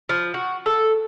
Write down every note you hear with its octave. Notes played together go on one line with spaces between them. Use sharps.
F3
F#4
A4